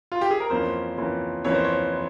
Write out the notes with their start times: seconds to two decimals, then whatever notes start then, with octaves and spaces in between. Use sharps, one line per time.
0.12 F4
0.21 G4
0.31 G#4
0.40 A#4
0.50 F2 E3 A#3 C#4 C5
0.97 F2 E3 A#3 C#4
1.45 F2 E3 A#3 C#4 C#5
1.54 C5
1.64 C#5
1.93 E3